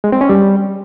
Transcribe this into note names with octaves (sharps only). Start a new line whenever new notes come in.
G#3
C4
C#4
G3